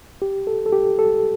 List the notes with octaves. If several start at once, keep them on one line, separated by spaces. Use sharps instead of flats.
G4
A4
A4
G4
A4